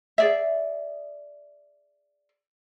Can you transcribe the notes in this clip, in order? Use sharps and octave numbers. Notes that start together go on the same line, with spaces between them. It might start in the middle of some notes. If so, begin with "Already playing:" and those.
G#4 D5 E5